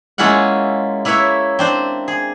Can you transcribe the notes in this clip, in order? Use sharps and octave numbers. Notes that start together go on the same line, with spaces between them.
G#3 A#3 C#4 E4 F4 F#5
A#3 E4 B4 C#5 E5
C4 D4 C5
G#4